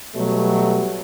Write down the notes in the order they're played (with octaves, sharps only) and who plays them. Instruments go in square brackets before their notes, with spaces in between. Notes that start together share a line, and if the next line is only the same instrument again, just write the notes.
[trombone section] B2 F#3 G3 A3